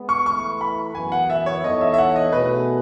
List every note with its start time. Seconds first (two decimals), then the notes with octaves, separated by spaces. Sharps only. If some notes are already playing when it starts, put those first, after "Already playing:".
Already playing: G#3 B3
0.09 C#6
0.26 A2 E3 A3 E4 B4 C#6
0.61 B5
0.95 F#2 E3 B3 G#5
1.12 F#5
1.30 E5
1.46 C#5
1.64 E3 B3 D#4 A4 C#5 D#5
1.81 E5
1.94 E5
1.98 F#5
2.16 D#5
2.32 B2 A3 D#4 G#4 B4